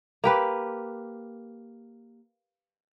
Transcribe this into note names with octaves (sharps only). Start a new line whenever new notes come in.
A#3 G4 B4